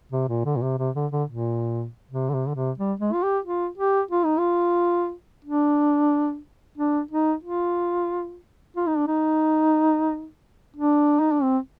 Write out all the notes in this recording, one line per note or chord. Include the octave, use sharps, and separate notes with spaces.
C3
A#2
D3
A#2
C3
C3
D3
D3
A#2
C3
D3
C3
D3
C3
G3
G#3
F4
G4
F4
G4
F4
D#4
F4
D4
D4
D#4
F4
F4
D#4
D4
D#4
D4
D#4
D4
C4